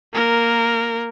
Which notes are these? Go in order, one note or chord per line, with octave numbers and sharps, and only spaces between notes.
A#3 A#4